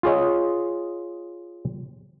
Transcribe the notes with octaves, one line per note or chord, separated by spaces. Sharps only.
F4 G#4 C#5 D#5